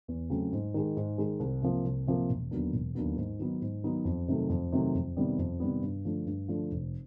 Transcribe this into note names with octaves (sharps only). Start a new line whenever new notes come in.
E2
C#3 F#3 A3 C4
G#2
D#3 G#3
G#2
D#3 G#3
C2
C3 F3 A#3
C2
C3 F3 A#3
E1
D#2 D3 F#3 B3
E1
D#2 D3 F#3 B3
G#2
D#3 F#3 B3 D#4
G#2
D#3 F#3 B3 D#4
F2
C3 D#3 F#3 A3
F2
C3 D#3 F#3 A3
F2
C3 D#3 G3 B3
F2
C3 D#3 G3 B3
G2
D3 F3 A3
G2
D3 F3 A3
F1